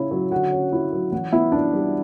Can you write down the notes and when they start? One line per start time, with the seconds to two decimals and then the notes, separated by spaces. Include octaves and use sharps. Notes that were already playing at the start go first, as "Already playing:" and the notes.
Already playing: C#3 C#4 E4
0.11 F#3
0.31 D3 F#4 F#5
0.52 C#4
0.72 E4
0.93 F#3
1.12 E3 F#4 F#5
1.32 B3 E4 E5
1.52 D4 D5
1.73 G3